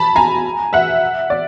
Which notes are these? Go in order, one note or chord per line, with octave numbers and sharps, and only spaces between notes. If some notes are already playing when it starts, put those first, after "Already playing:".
Already playing: A5 B5
G#5 A#5
E5 F#5
D5